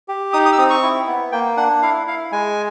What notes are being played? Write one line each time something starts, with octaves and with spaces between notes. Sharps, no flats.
G4
D#4 D#6
D#6
E6
C4 D#6
C#6
E4
B3
A#3 G5
D4 F#5
E4 F5
E4 F5
G#3 G#5